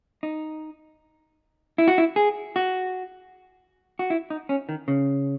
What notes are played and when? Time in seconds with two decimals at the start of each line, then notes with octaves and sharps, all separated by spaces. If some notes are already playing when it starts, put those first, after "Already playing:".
0.23 D#4
1.78 E4
1.88 F#4
1.98 E4
2.16 G#4
2.56 F#4
3.99 F#4
4.10 E4
4.30 D#4
4.49 C#4
4.69 D#3
4.88 C#3